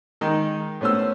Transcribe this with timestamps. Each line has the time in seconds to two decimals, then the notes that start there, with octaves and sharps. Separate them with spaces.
0.21 D#3 G#3 D#4
0.81 A2 B3 C#4 C5 E6